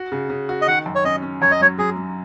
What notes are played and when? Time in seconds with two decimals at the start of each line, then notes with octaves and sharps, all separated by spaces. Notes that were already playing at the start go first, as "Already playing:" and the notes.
Already playing: F#4
0.12 C#3
0.30 C#3
0.49 F#4
0.61 D#5
0.67 D#3 F#5
0.86 F#2
0.95 C#5
1.05 C#4 D#5
1.22 C#4
1.42 F#2 C#5
1.51 D#5
1.60 F#3 C#5
1.79 F#3 G#4
1.97 F#3